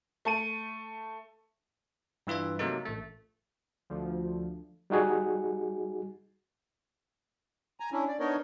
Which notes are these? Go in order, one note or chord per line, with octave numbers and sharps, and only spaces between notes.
A3 A5 D#7
G2 E3 F4 B4 E5
C3 F#3 A3 A#3 D#4
A1 A3
D2 F3
G3 D#4 F#4 G#4
G#5 A#5
C#4 D4 E4
D5
B3 D4 D#4 A#4 C#5 D#5